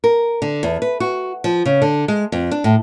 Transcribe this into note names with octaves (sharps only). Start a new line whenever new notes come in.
A#4
D3
E2
B4
F#4
F3
C#3
D3
G#3
F2
D4
A2